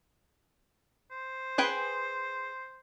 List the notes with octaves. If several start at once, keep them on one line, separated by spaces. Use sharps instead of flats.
C5
G#4 B4 G5